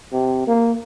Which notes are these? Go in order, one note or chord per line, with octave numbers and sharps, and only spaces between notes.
C3
A#3